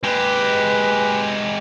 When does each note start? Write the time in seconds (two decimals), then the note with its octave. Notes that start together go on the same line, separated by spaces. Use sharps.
0.04 G#3 G4 B4